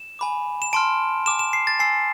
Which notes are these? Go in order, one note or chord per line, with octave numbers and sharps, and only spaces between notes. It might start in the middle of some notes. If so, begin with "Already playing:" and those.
Already playing: E7
G#5 B5 D6
E7
A5 C6 F6 D7
G#5 D6 F6 E7
E7
C7
A6
G#5 C6 E6 C7